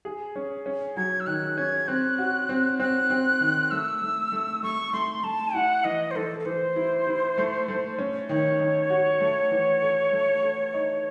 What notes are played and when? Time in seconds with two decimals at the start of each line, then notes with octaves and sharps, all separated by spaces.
0.05 G#4
0.36 C#4
0.66 C#4
0.97 F#3 G#6
1.20 E6
1.27 D#3 F#6
1.57 C#4 G#6
1.88 C4 F#6
2.18 F#4
2.49 C4
2.80 C4 F#6
3.10 C4
3.41 D#3
3.71 A3 E6
4.02 A3
4.32 A3
4.63 A3 C#6
4.93 A3 C6
5.24 A3 A5
5.54 E4 F#5
5.84 E3 D#5
6.11 C5
6.15 E3 A4
6.40 A4
6.46 E3 C5
6.76 E4
7.07 E4
7.38 A3
7.68 A3
7.98 C#4
8.29 D#3 C#5
8.60 D#3
8.90 F#4
9.21 A3
9.51 E3
9.82 A4
10.12 A3
10.42 A4
10.74 D#4